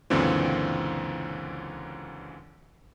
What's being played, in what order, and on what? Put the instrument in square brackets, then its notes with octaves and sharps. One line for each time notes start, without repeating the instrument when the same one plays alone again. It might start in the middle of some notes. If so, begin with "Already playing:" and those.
[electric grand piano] C#2 F#2 A#2 D3 E3 C4